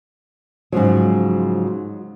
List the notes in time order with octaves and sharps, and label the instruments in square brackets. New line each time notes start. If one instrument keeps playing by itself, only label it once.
[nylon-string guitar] G#2 C#3 F3 F#3